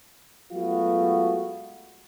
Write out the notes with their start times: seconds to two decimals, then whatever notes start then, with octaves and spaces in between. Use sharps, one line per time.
0.52 F#3 G#3 A3 B3 F4 F#4